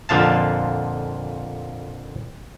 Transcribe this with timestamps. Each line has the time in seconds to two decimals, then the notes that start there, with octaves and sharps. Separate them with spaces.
0.09 F2 A#2 D3 F3 F5 A5